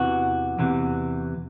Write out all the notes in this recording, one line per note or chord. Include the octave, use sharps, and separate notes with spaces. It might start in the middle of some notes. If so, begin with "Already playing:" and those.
Already playing: E2 C3 E3 F#4
E2 C3 E3